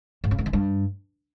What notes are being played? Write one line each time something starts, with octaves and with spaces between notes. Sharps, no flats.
G#2
C#3
G#2
D#3
G2